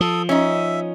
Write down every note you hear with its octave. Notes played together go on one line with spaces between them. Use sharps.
F3 A4 D#6
C#4 D#4 E5